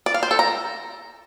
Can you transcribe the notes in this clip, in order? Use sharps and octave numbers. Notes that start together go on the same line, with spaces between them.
D5
F5
C5
A4
A#5